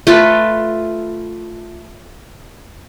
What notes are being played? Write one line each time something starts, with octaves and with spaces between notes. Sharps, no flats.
A3 F4 A4 B4